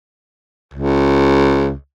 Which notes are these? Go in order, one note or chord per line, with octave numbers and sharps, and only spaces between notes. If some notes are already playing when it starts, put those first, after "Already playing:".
C#2